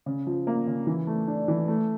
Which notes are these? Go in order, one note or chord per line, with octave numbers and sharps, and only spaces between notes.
C#3
F3
A#3
C#3
E3
A3
D4
E3
A3